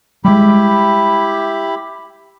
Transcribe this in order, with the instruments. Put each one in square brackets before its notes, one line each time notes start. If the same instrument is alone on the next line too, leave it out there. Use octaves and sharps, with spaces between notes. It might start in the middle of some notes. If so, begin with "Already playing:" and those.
[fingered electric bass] G3 G#3 [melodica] E4 G4 B5